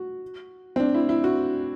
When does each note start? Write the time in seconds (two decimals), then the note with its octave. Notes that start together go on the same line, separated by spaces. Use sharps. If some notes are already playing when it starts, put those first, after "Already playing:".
Already playing: F#4
0.76 C4
0.80 D4
0.94 E4
1.09 E4
1.24 F#4